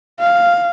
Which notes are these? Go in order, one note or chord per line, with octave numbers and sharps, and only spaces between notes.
F5